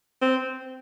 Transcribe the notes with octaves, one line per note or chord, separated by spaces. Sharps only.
C4